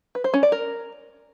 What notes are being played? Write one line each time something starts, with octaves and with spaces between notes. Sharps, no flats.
B4
C5
C#4
D5
A#4